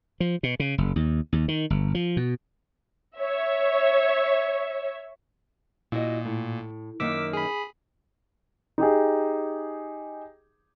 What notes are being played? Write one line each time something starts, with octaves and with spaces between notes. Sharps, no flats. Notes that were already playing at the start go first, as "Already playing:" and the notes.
F3
B2
C#3
F#1
D#2
D#2
D#3
G1
F3
B2
C#5 E5
A#2 E4 F#4 D#5
A2
F#2 D#3 A#3 D6 E6 B6
G#4 B5
D#4 G4 G#4